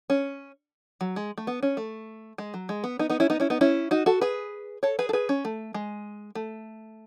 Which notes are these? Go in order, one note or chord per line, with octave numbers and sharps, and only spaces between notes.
C#4
F#3
G#3
A3
B3
C#4
A3
G#3
F#3
G#3
B3
B3 D#4
B3 D#4
C#4 E4
B3 D#4
C#4 E4
B3 D#4
C#4 E4
D#4 F#4
F#4 A4
G#4 B4
A4 C#5
G#4 B4
A4
G#4 B4
C#4
A3
G#3
A3